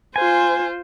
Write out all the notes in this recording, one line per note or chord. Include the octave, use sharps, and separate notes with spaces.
F4 C5 G#5